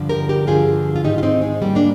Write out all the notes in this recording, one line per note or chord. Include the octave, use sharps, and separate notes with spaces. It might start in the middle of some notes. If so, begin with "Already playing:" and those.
Already playing: G2 D3 F3
G4 A#4
G4 A#4
G2 D3 F3 F4 G#4
F4
G#2 D#3 D#4 G4
F4
C4 D#4
G#3
G#2 D#3 G3 A#3
A#3 D4